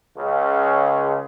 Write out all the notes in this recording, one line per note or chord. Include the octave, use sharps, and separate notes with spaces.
C#2 C#3